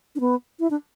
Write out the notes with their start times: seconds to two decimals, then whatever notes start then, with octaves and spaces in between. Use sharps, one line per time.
0.16 D4
0.20 B3
0.60 E4
0.70 D4